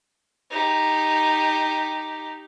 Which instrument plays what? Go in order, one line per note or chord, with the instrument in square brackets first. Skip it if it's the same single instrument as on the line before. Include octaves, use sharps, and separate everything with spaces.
[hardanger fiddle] D#4 G4